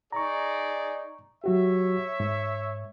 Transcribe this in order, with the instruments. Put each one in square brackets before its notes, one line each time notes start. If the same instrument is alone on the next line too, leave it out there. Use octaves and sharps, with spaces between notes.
[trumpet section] D#4 G#4 D5 [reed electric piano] A#5 C#6
[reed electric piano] F#3 F#4 G4 [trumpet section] C#5 E5
[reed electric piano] G#2